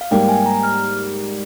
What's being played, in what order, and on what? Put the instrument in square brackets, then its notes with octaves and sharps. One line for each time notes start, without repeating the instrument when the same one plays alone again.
[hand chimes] F5
[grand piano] G#2 G3 A#3 [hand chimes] G5
[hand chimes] G#5
A#5
F6